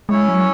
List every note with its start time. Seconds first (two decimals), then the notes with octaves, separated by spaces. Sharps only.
0.09 G#3 C#4 E4 C#5
0.29 F#3